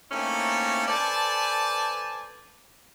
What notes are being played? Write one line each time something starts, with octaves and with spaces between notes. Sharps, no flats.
A3 A#3 C4 C#4 D#4 E4
A4 B4 C5 D5 G#5 A5